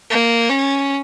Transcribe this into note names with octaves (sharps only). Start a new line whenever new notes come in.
A#3
C#4